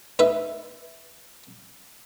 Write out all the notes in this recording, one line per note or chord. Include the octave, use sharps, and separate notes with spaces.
D#4 B4 E5